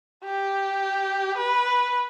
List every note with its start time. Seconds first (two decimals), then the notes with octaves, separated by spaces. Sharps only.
0.24 G4
1.37 B4